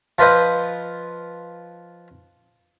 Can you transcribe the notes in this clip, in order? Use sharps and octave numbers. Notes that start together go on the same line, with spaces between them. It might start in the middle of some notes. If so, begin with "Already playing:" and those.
F3 F4 B4 C5 D#5